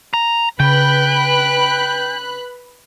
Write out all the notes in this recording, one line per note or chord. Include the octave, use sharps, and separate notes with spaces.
A#5
C#3 B4 G5 B5 F#6